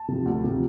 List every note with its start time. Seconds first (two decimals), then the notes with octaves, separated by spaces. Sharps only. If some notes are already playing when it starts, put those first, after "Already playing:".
Already playing: A5
0.08 C3 F3
0.26 D2
0.44 C3 F3